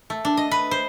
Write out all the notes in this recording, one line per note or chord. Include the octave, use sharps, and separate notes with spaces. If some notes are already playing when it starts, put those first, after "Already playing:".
A3
D4
D#5
B4
C5